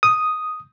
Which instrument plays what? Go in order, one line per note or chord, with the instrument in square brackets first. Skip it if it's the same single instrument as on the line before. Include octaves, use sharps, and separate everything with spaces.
[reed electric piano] D#6